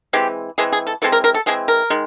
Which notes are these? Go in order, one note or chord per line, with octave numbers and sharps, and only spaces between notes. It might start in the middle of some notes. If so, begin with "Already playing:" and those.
E3 G#3 C4 G4
E3 G#3 C4 G#4
G#4
A4
E3 G#3 C4 A4
A#4
A#4
A4
E3 G#3 C4 G#4
A#4
D#3 G#3